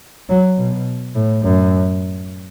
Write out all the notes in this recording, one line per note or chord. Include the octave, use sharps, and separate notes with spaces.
F#3
B2
A2
F#2